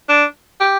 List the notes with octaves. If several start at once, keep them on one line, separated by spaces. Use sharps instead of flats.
D4
G4